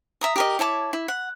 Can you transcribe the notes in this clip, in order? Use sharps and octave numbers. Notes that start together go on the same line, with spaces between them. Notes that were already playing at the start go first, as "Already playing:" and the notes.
E5 A#5 D#6
G4 A#4 D#5
E4 C#5 A5 D6
E4
F#5